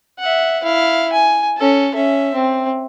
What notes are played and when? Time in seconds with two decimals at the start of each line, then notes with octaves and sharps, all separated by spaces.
0.19 E5 F#5
0.64 E4 F5
1.13 G#5
1.58 C#4 A4
1.95 C#4 E5
2.34 C4